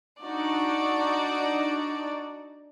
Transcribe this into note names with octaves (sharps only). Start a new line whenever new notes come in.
D4 D#4 F#4 D5